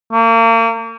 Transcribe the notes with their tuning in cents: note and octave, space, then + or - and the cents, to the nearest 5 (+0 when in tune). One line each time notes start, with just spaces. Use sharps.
A#3 -35